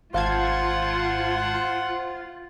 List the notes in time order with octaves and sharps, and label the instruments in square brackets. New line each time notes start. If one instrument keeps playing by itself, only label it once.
[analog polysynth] G#1 A5 G#6 [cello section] F4 [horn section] C5 F#5 [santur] F5